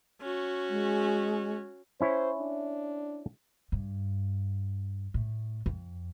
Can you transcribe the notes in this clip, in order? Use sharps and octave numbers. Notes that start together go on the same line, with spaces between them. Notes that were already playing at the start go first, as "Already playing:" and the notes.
C#4 F#4
G#3
C#4 E4 C5 C#5
D4
G2
A2
F2